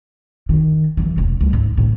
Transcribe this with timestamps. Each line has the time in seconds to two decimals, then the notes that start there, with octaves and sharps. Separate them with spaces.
0.49 D#3
0.97 F#2 E3
1.17 E1 D2
1.40 D2 G3
1.53 G#2
1.77 F#2 A2